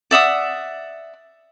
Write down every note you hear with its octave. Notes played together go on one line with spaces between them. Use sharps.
D5 E5 F#5 D#6